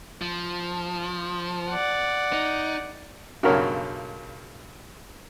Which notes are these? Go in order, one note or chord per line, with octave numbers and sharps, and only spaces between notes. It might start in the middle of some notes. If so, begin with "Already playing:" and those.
F3
D5 F#5
D#4
B1 G2 C#3 F#4 A#4 C#5